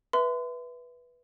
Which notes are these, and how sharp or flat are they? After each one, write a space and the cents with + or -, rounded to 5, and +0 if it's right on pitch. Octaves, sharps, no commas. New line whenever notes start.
B4 -10 E5 +0 C6 -40